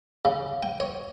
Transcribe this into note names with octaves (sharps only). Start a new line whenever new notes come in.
C#3
G5
C#5